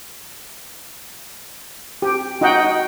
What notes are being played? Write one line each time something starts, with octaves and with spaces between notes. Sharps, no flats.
G4
D#4 F#4 D#5 F#5 G5